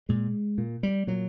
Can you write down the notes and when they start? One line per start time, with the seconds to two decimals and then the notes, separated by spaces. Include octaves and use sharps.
0.09 A#2 G#3
0.58 A#2
0.83 G3
1.07 A#2 F#3